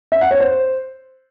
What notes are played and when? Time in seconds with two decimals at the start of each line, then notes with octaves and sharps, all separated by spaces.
0.12 E5
0.21 F#5
0.31 C#5
0.40 C5